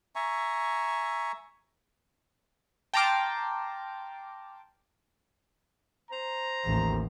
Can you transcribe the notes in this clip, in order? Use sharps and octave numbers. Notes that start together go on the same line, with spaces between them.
E5 G#5 A#5 C#6
G5 A5 A#5 C6 D6 F6
C5 A#5
A1 D#2